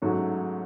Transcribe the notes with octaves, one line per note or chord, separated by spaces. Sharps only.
G#2 F#3 A3 C#4 F#4